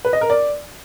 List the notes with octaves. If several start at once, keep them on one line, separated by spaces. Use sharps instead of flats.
B4
D#5
A#4
D5